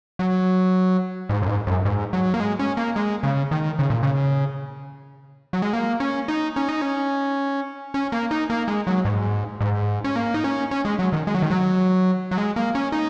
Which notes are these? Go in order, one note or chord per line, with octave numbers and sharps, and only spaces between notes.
F#3
G#2
F#2
G#2
F#2
G#2
F#3
A#3
G#3
C#4
A#3
G#3
C#3
D#3
C#3
A#2
C#3
F#3
G#3
A#3
C#4
D#4
C#4
D#4
C#4
C#4
A#3
D#4
A#3
G#3
F#3
G#2
G#2
C#4
A#3
D#4
C#4
C#4
G#3
F#3
D#3
G#3
F#3
D#3
F#3
F#3
G#3
A#3
C#4
D#4